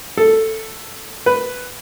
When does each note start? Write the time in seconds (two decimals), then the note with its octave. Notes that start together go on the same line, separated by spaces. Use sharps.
0.17 A4
1.26 B4